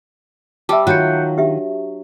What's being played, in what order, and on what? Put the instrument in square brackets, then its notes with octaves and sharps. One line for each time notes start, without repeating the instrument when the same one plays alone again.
[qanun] G3 [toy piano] E5 A5 [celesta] D6 E6
[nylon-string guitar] D#3 F4 [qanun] F#3 [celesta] F#6 G6 C#7
[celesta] D4 [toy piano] G4 E5